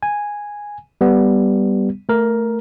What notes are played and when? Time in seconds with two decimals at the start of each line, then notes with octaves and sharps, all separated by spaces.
0.03 G#5
1.01 G3 B3
2.09 A3 A#4